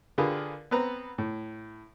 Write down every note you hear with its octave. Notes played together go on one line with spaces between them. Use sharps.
D3 F4 G4 G#4 A#4 B4
B3 C4 B4 A#5
A2